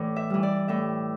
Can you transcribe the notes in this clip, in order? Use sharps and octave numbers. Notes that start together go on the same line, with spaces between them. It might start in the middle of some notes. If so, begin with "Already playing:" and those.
Already playing: A2 E3 D5
E5
E3 G3
D5
A2 E5